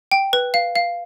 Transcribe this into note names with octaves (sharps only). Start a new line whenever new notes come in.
G5
B4
F5
F5